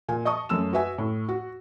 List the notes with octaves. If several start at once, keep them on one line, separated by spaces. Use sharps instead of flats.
A#2 G#5
D#5 A5 C#6 D#6
F#2 A3 E6 E7
F#4 B4 E5 G#5
A2
F#4